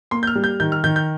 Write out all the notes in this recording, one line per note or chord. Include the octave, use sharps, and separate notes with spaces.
A#3 C6
G6
F6
G3
G6
D#3 G6
F6
D#3 G6
G6